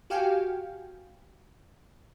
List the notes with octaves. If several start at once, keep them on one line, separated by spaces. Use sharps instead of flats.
F#4 G4 F5 G5 G#5